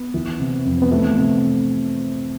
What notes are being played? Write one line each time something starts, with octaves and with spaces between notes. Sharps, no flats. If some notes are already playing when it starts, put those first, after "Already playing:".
Already playing: B3
E3
C3
F2
B3
E3 A3
C3